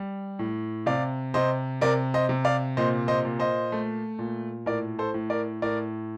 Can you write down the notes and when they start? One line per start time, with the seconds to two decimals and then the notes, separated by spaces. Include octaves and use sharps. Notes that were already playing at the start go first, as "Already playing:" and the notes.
Already playing: G3
0.39 A2
0.86 C3 D5 F5
1.34 C3 C5 D#5
1.81 C3 A#4 D5
2.14 C5 D#5
2.29 C3
2.45 D5 F5
2.77 A#2 C5 D#5
3.08 C5 D#5
3.25 A#2
3.40 C5 D#5
3.72 A3
4.19 A#2
4.66 A2 A#4 D5
4.99 A4 C5
5.14 A2
5.30 A#4 D5
5.62 A2 A#4 D5